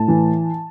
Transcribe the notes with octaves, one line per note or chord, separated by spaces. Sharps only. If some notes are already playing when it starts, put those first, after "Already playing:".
Already playing: A2 A5
E3